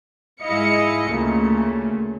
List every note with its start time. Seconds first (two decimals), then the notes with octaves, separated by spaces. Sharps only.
0.43 G#2 G#3 E4 D#5 F5 C#7
1.11 D2 A#2 C#3 A3